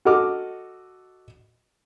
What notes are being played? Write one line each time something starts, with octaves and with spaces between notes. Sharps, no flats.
F#4 A4 D#5 D6 F6